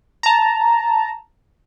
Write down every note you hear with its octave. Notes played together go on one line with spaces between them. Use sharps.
A5 A#5